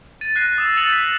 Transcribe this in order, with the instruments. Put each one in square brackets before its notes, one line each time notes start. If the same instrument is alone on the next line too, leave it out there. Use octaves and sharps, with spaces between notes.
[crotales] A6 D#7
F#6 G6 A#6 C7 D#7
D#6 E6 E7
E6 A6 C#7 F7 F#7
G6 B6